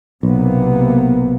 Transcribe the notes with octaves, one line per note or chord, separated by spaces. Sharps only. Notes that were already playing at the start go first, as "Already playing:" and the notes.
B1 C3 A#3 B3